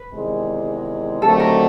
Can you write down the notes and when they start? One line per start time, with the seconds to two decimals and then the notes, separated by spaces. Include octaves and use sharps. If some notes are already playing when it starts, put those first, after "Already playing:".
Already playing: B4
0.12 E2 C3 D#3 G#3
1.22 D#2 D3 F#3 A3 C4 A4
1.40 A#4